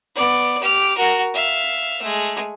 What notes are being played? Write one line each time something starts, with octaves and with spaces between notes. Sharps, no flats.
B3 D5
G4 F6
F#4 A#4
E5 F5
G#3 A3